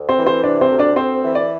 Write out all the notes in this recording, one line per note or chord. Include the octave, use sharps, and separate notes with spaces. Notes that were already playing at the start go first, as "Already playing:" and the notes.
Already playing: D2
C4 C5
E3
C4 C5
C3 D4 D5
C4 C5
D2
D4 D5
D2 C4 C5
E3
D5